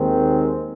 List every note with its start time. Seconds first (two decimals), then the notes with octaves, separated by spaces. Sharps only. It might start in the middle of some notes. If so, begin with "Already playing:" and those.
Already playing: D#2 D#3 G#3 C4